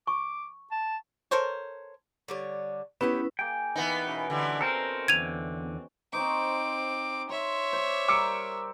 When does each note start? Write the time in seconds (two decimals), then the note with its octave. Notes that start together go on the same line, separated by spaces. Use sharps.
0.07 C#6 D6
0.72 A5
1.31 A4 A#4 C5 C#5
2.28 D3 G3 C#5
3.01 B3 C#4 E4 G4 B4 C#5 G#5
3.39 A#3 G#4 G5
3.76 E3 B3 D#4
4.06 B2 C#4
4.30 D3 E3 G3
4.61 C4 A4 A#4 C5
5.08 E2 D3 G#6 D#7 F7
6.13 C4 D#4 C5 C#6 D6
7.30 C#5 E5 C6
7.73 C5 D5
8.08 G3 A#4 D6 E6 C#7